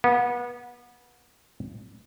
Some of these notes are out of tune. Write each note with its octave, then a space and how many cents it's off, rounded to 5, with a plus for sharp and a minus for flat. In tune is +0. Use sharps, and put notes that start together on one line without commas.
B3 -30